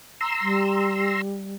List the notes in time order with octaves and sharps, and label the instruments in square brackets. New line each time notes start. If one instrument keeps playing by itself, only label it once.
[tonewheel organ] A#5 C6 E6
[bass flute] G3